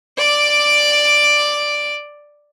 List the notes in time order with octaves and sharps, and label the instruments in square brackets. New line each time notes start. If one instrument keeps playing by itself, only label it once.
[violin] D5 D6